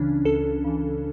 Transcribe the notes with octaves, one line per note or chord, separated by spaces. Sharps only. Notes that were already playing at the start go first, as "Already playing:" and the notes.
Already playing: C#2 C#3 E3 C#4 D4
C#2 A4
C#3 E3